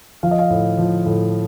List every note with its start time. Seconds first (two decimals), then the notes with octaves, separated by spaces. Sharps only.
0.23 F3 F5
0.31 D#5
0.39 F5
0.50 A2
0.78 F3
1.06 A2